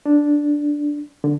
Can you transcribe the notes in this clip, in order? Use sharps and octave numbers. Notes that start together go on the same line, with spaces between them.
D4
D3